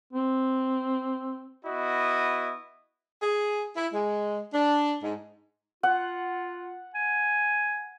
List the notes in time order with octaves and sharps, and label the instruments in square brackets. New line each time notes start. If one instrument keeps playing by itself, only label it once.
[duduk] C4
[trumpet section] B3 E4 F#4 D#5 D#6
[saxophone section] G#4
E4
G#3
D4
G#2
[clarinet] F4 [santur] F#5
[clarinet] G#5